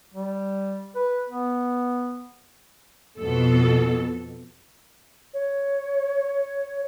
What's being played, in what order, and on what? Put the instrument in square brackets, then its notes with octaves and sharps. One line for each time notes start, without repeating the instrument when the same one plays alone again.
[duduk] G3
B4
B3
[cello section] F2 B2 A4
[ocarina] C#5